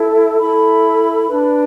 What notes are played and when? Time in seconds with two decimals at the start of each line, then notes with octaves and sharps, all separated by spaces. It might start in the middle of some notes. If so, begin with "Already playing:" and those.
Already playing: E4 A4
0.40 E4 A4 B5
1.27 D4 B4